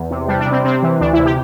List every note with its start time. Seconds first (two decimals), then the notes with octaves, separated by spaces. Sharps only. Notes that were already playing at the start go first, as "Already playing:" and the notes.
Already playing: E2
0.11 C3
0.27 G3 D4
0.40 D4
0.46 C3
0.52 C4
0.64 C3 C4
0.82 E3
1.00 D2 D4
1.13 E4
1.18 C3
1.25 G4